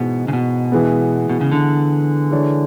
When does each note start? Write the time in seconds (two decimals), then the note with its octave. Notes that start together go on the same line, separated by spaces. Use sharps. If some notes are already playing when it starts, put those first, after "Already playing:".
Already playing: G#2 B2 E3 G#3
0.28 C#3
0.33 B2
0.72 E3 G#3 B3
1.29 B2
1.41 C#3
1.52 D3
2.31 E3 G#3 D4 A4 C#5